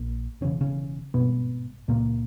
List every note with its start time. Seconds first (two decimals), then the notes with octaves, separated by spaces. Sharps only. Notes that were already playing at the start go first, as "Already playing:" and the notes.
Already playing: A#1 A#2
0.41 E1 E2 C#3 C#4
0.61 C#3 C#4
1.14 G#1 G2 B2 B3
1.88 C#2 A#2 C#3 A#3